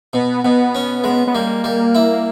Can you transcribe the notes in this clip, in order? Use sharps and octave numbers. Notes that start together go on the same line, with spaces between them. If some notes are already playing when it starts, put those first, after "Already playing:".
B2 B3
B2 B3
C#4
G#3
B3
G3 A#3
G3
E4